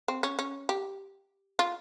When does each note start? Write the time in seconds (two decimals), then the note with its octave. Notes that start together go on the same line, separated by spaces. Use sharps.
0.08 C4
0.23 C#4
0.39 C#4
0.69 G4
1.59 F4